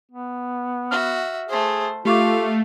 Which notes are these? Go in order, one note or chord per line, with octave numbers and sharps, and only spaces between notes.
B3
F#4 E5 F6
A3 G#4 C5
A3 F4 G4 F5 C#6 D6